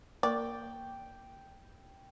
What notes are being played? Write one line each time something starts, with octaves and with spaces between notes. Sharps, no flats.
A#3 A#4 D5 G5 C#6